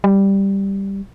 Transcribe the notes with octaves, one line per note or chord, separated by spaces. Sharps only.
G3